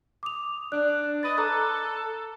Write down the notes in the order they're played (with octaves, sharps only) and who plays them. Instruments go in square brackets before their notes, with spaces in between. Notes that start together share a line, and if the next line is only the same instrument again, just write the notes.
[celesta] D6 D#6 F7
[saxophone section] D4 [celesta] D5 F#6
[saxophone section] B4 D#5 [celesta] A6
[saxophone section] A4 [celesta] A#5 D6 F#6